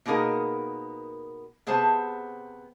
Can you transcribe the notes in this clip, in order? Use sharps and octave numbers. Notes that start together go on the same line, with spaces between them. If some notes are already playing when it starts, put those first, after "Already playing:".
B2 A#3 B3 D#4 G#4 A#4
C3 B3 G#4 C5 A5